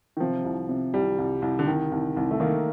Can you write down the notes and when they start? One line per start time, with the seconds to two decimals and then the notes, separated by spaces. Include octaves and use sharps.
0.17 D#3
0.20 C3 F3
0.44 C2
0.69 C3
0.94 C2 G3
1.18 C2
1.42 C2
1.59 D3
1.67 C2 D#3
1.92 C2
2.17 C2
2.31 A3
2.40 D#3 A#3